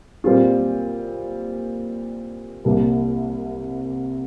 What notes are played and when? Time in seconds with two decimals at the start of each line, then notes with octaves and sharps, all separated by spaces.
0.24 A#2 G3 C4 F4
2.65 C2 C3 G3 A#3